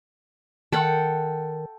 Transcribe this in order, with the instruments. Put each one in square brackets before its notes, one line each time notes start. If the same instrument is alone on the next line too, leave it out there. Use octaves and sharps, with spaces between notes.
[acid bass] D#3 [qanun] A4 F#5 G5